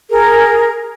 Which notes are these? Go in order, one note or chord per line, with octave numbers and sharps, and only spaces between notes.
G#4 A#4